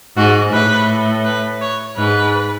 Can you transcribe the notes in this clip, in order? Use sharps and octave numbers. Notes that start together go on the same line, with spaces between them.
G#2 F#4
A2 B4
B4
C#5
G#2 B4